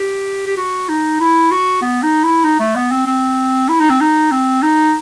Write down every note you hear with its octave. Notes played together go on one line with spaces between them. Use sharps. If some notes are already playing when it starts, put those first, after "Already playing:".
Already playing: G4
G4
F#4
D#4
E4
F#4
B3
D#4
E4
D#4
A3
B3
C4
C4
E4
D#4
C4
D#4
C4
D#4